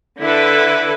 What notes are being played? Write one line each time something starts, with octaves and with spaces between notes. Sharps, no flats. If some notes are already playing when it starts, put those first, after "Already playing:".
D3 E4 A4 B4